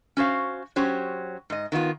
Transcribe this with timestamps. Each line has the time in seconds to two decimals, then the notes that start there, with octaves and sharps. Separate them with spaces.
0.17 C#4 F#4 C5 F5
0.76 F#3 C#4 G4 C5
1.50 G#2 D#5
1.72 D#3 B3 E4 F4